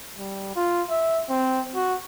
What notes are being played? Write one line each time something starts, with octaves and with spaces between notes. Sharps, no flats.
G3
F4
E5
C4
F#4